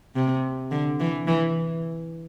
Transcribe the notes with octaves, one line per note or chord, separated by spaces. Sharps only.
C3
D3
E3
E3